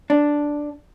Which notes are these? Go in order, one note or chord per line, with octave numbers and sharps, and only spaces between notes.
D4